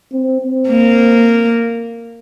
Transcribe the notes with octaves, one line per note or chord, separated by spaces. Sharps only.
C4
C4
A#3